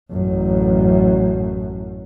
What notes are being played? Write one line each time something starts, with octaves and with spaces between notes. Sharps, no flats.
A1 F#2